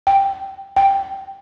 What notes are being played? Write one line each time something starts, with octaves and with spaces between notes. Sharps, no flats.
G5
G5